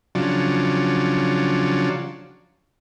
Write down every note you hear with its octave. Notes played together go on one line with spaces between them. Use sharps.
C#3 F3 F#3 D4